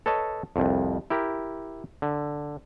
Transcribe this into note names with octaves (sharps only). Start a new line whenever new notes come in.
A4 B4 C#5 D#5 A5
C2 F2
E4 G4 A#4
D3